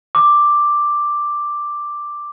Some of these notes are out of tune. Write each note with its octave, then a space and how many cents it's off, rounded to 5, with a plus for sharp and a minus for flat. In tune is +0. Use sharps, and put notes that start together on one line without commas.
D6 +5